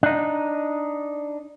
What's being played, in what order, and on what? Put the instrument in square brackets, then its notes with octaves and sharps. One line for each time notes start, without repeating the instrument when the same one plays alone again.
[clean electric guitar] D4 D#4